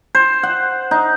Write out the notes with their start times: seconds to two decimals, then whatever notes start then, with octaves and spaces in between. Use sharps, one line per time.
0.15 C5
0.43 F#5
0.91 D#4